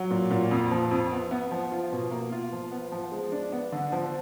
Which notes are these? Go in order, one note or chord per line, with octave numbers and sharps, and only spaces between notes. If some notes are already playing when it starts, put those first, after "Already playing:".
Already playing: F#3
A#2
A#2
F2
F3
F2
B3
B3
F3
F4
B2
A#3
F4
F3
B3
F3
G#3
D4
B3
D3
F3